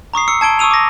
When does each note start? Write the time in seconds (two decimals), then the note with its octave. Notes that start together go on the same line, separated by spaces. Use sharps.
0.14 A#5 C#6 D#6 C7
0.28 E6 C#7
0.41 A5 G#6 D7 G7
0.59 C#6 D#6 E6 D#7 F7
0.71 D6 A#6